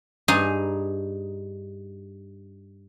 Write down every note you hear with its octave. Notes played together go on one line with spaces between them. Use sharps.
G2 D#4 G#4 G#5